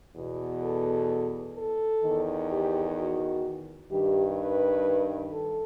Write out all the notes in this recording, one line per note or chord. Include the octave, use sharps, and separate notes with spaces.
E2 B2
A4
A4
E2 D#3
G4
F#4
G2 D#3 G4
B4
A4